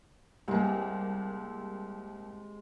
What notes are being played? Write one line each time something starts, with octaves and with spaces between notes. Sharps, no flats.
C2 C3 G#3 A#3